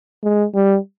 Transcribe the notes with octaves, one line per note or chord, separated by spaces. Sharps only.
G#3
G3